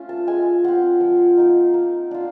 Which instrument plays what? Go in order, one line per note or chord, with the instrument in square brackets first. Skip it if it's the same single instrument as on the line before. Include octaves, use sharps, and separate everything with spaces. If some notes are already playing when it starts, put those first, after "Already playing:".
Already playing: [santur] A3 C#4 F4
A5
G#3 G#5
C4 F4 F#5
F3
A#3 D#4
A#3
D4 F4